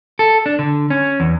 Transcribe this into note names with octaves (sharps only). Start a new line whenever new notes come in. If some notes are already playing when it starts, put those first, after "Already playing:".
A4
D4
D3
C#4
E2